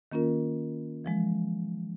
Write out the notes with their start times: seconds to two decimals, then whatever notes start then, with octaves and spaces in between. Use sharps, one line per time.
0.12 D#3 A#3 C#4 F4 A#4
1.05 E3 F3 G#3